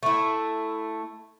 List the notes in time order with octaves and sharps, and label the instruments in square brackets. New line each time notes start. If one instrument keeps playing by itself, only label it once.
[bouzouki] A3 E4